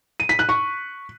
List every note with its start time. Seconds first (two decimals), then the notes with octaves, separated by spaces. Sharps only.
0.20 D#7
0.29 B6
0.39 F#6
0.49 C#6